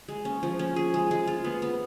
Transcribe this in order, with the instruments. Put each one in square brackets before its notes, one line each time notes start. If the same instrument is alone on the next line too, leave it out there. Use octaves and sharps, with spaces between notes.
[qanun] G#3
C#4
F3
C#4
G#4
G#3
G#3
F4
B3
B3